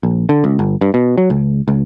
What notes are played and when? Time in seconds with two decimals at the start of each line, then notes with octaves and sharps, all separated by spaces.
0.03 A#1
0.29 D3
0.44 C#2
0.59 G1
0.81 G2
0.94 B2
1.18 F#3
1.30 C#2
1.68 C#2